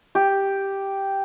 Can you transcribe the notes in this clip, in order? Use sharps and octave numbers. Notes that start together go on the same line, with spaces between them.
G4